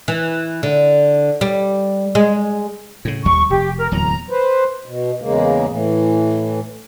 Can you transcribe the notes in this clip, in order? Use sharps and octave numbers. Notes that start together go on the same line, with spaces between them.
E3
D3
G3
G#3
A2 C#3
D#1 D#2 G3 C#6
F1 G4
A#4
D1 E2 F#3 A#5
B4 C5
B2
E2 C#3 G#3 A#3
A2 E3